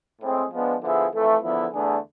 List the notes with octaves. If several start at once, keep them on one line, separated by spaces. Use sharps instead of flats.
A2 G#3 C4 G#4
F3 G#3 B3 D4
D3 F3 B3 E4 G#4
F2 E3 A3
E2 D3 F3 B3 E4
E2 D3 A3 D4 G#4